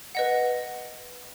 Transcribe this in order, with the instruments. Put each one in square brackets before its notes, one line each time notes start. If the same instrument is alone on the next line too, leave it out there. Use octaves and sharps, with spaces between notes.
[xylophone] B4 D#5 F#5